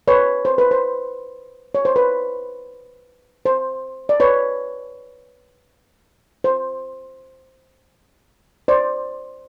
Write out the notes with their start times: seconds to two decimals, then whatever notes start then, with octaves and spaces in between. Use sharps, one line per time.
0.08 B4 C#5
0.45 C5
0.58 B4
0.71 C5
1.75 C#5
1.85 C5
1.96 B4
3.46 C5
4.09 D5
4.20 B4 C#5
6.44 C5
8.68 C5 D5